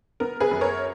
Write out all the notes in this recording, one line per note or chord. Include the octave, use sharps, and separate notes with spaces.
B3 A#4
G#4 B4
F#2
A#4 C#5